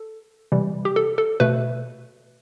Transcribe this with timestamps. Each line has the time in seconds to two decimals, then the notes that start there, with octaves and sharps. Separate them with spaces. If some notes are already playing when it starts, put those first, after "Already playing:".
Already playing: A4
0.52 C3 E3 G3
0.85 G4
0.96 A4
1.18 A4
1.40 B2 A3 B4